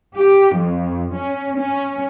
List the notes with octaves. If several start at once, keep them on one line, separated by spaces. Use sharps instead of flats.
G4
F2
C#4
C#4